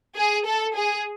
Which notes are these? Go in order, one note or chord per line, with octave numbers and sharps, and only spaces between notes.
G#4
A4
G#4